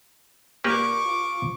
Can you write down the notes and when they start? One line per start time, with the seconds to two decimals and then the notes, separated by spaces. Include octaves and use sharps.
0.64 A#2 A#3 G4 B4 C#6 D6
1.05 F4